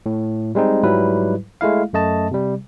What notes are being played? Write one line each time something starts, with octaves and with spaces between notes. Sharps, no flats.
A2
G3 G#3 C4 D#4
G#2 F#3 G3 E4 B4
G#3 A3 E4 F5
F#2 A3 D#5 A5
C3 G3